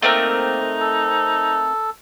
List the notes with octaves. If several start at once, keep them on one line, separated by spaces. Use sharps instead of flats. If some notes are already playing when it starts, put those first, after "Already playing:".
A3 A#3 C4 D#4 A#4
A4